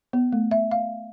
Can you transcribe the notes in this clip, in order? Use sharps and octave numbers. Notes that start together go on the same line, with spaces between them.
B3
A3
E5
F5